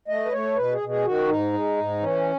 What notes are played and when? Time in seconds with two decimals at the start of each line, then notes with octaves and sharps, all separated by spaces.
0.08 A3 D#5
0.25 B4
0.32 A3 C#5
0.56 B2 B4
0.73 G#4
0.81 B2
0.89 G#4
1.05 D#3 F#4
1.29 G#2 D#4
1.53 G#3
1.77 G#2
2.01 E3 C#4